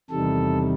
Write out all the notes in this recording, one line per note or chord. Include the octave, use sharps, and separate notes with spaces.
E2 C3 D#3 G3 A4